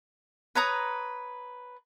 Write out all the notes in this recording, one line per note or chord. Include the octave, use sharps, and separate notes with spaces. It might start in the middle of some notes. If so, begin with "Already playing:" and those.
B4 C#5 A#5 D#6